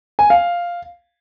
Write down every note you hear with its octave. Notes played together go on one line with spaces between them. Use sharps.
G#5
F5